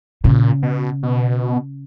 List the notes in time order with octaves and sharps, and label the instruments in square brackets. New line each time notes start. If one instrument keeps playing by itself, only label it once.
[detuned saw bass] A#2 [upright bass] C#3
[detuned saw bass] B2
B2